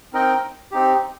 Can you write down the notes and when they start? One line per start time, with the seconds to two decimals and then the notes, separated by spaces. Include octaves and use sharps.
0.13 C4 D#4 A#4 D#5 G5
0.71 C4 D#4 G4